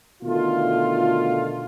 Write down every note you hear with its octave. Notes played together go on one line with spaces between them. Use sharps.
B2 D3 D#3 A3 F4